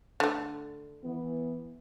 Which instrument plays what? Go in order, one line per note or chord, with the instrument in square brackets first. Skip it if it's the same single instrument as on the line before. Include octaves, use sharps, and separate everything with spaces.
[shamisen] D3 A3
[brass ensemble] E3 B3